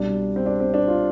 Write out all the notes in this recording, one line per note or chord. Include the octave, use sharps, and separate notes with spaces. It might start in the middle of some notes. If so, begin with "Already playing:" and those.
Already playing: C2 B2 G3 D4
C4
D4
C4
D4
F4